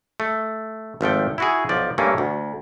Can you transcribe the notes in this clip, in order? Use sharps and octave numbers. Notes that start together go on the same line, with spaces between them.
A3
G#1 F3 A3 G5
E4 F#4 G#4
B1 F3 D5
G2 A3 A#3 C#4
D2